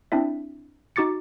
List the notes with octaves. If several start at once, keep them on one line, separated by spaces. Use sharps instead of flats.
C4 D4 E4 E5
D#4 F#4 D6 A6 C#7